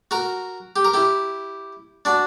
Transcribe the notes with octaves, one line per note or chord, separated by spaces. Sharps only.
F#4 A#4
G4
A#4
E4 G4
D4 F#4